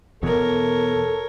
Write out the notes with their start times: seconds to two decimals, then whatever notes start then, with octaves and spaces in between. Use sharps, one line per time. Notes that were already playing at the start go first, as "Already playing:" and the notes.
0.23 E2 B2 A4 A#4 C#5